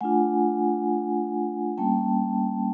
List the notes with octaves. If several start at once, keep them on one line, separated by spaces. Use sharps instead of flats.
A3 D4 F4 F#5 G#5
G3 A#3 C#4 G5 A5